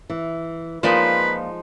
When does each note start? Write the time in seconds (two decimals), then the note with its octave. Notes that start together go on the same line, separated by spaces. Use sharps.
0.10 E3
0.83 F3 G#3 A#3 D#4 F4 B4 D5 F5